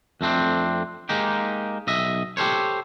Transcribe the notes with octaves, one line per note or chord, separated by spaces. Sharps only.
F2 A3 C4 D4
G#3 A#3 D#4 G4
B1 D#5 E5
G4 A4 C5 C#5